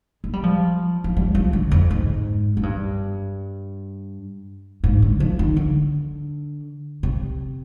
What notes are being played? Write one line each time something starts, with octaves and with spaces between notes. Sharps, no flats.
G#3
G3
F3
F3
G3
F3
D3
F2
G#2
G#2
G2
G#2
D3
F3
D#3
D3
C3